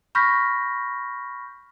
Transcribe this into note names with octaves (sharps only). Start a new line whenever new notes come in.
B5 C#6 F6 G6 A#6 B6